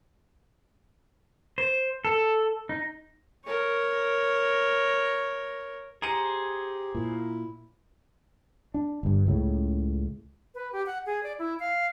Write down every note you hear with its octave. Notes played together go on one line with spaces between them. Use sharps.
C5
A4
D#4
A#4 C#5
G4 G#4 C5 A#5 C#7 D#7
A#2 E4
D4
G1 G2
C#2 A2 C#3
B4
G4
F#5
G#4
D5
E4
F5